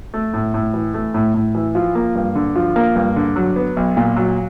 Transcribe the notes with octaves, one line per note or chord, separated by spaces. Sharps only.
A3
A2
A2
E3
A3
A2
A2
E3
F3
A#3
G2
D3
F3
A#3
G2
D3
F#3
B3
B1
A#2
F#3